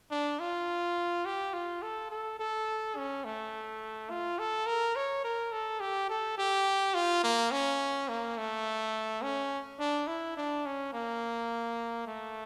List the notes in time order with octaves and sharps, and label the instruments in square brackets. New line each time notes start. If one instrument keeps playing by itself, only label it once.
[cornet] D4
F4
G4
F4
A4
A4
A4
C#4
A3
F4
A4
A#4
C#5
A#4
A4
G4
A4
G4
F4
A#3
C#4
A#3
A3
C#4
D4
E4
D4
C#4
A#3
A3